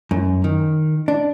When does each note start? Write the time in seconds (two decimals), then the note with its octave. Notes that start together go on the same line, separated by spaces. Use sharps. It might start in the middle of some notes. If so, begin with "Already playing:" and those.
0.11 F#2
0.44 D#3
1.08 D4